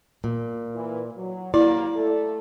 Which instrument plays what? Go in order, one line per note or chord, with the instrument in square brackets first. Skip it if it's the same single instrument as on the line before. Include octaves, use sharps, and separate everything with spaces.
[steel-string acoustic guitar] A#2
[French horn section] E3
F#3
[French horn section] F#3 G3 A#3 [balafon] E4 [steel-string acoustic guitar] D5
[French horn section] A3 A4